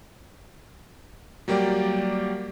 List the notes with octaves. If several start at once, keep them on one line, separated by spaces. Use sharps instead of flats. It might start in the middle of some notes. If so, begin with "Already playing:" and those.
F#3 G3 A#3 G4 D5